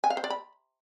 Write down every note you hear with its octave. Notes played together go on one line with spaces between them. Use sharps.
G#5
F5
C5
D5
B5